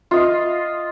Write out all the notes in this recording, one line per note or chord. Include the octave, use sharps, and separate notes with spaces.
F4 D#5 F5